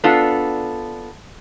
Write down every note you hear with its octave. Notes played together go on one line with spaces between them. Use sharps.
B3 D4 F4 A4